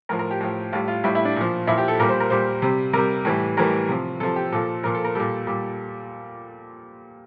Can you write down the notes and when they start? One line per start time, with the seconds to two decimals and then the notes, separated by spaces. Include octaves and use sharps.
0.09 A2 F3 A#4
0.19 A#4
0.31 G4
0.41 A2 F3
0.72 A2 G3 F4
0.88 F4
1.04 A2 G3 E4
1.15 E4
1.25 D4
1.36 A#2 F3
1.67 A#2 F3 E4
1.78 G4
1.88 A4
2.00 A#2 G3 A#4
2.09 C5
2.20 A#4
2.30 A#2 G3 C5
2.62 C3 G3
2.93 C3 G3 A#4
3.25 A2 E3 G3
3.57 A2 E3 G3 A#4
3.89 C3 F3
4.20 C3 F3 A4
4.36 G4
4.52 A#2 F3 A4
4.83 A#2 F3 A#4
4.95 A4
5.05 A#4
5.15 A#2 G3 A4
5.47 A#2 G3